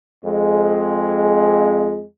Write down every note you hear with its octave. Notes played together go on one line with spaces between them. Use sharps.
F2 G#3